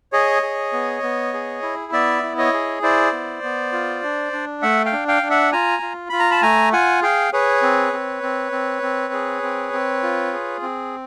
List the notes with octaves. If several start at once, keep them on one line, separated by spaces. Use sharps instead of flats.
G#4 C#5 D#5
G#4
B3
B3
G#4
E4
B3 D5 E5
E4
C#5 D#5
G#4
E4 C5 D5
B3
B3
F4
D4
D4
A3 E5 F#5
F5 G5
D4
F5 G5
D4
E5 F#5
F4 G#5 A#5
F4
F4 B5
A#5
A5 B5
A3 G#5 A#5
F4 F#5 G#5
G#4 F5 G5
G#4 B4 C#5
C4
C4
C4
C4
C4
G#4
C4
C4
F4
G#4
C4